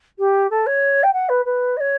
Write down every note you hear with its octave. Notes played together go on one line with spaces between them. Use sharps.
G4
A4
C#5
G5
F#5
B4
B4
D#5
C#5